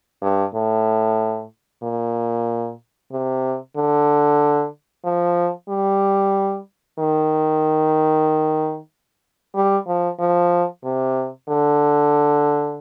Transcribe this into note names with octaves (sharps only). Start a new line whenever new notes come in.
G2
A2
A#2
C3
D3
F3
G3
D#3
G3
F3
F3
C3
D3